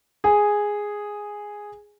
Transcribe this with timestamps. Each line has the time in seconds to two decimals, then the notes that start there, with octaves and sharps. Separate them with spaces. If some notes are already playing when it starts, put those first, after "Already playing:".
0.24 G#4 G#5